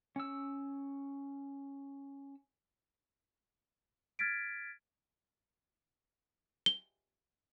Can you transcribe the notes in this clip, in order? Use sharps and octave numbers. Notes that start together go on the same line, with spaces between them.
C#4 E6
F6 G#6 A6 B6 D7
G7